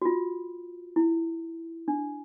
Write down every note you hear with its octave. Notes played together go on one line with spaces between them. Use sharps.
F#4
F4
E4
D4